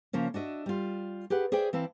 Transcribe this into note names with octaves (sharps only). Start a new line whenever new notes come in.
C#3 F3 A#3 C#4
D4 F#4 D#5 E5
G3 F4
G4 G#4 B4 F#5
G#4 C5 D5 E5 G5
E3 C4 E4 F5 A5